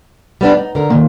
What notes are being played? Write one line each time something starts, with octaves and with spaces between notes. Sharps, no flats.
G3 B3 D4
D#4
D3 A#4
A#2 D#3 A#3